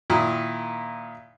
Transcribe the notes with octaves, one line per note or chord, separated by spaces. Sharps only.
A#2 D#3 E4